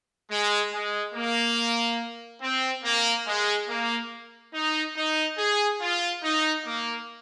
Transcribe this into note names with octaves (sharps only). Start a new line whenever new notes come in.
G#3
G#3
A#3
C4
A#3
G#3
A#3
D#4
D#4
G#4
F4
D#4
A#3